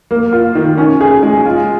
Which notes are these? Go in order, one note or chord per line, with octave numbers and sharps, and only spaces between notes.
A#3
F4
D#3
C#4
G#4
G#3
F4